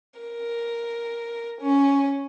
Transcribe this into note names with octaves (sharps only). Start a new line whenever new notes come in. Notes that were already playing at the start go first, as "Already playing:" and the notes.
A#4
C#4